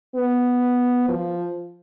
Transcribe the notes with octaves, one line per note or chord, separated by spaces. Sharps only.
B3
F3